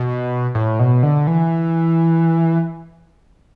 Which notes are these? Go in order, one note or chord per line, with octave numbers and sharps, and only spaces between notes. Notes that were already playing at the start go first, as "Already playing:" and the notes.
Already playing: B2
A2
B2
D3
E3